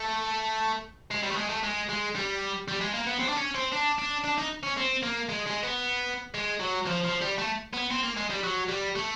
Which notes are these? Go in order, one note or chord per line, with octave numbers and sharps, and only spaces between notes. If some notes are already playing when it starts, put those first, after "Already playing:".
Already playing: A3
G#3
G3
A3
G#3
A3
G#3
G#3
G3
G3
G#3
A#3
B3
C4
D4
C#4
C4
D4
D4
D4
D#4
C#4
C4
A#3
G#3
G#3
B3
G#3
F#3
F3
F3
G3
A3
B3
C4
A#3
G#3
G3
F#3
G3
A3